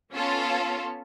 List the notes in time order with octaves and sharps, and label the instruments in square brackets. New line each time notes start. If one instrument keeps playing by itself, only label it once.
[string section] B3 C#4 F4 A4